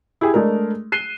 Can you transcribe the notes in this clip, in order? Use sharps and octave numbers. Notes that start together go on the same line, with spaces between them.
E4 G4 G#4
G#3 A3 D4 A#4
F#6 C7 D#7 E7 G7